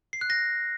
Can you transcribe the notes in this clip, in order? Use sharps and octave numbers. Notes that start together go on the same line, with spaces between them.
C7
F#6
A#6